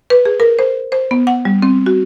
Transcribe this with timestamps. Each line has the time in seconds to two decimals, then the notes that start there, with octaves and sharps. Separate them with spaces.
0.10 B4
0.25 G#4
0.40 A#4
0.59 C5
0.92 C5
1.11 B3
1.27 F#5
1.45 G3
1.62 C4
1.86 F#4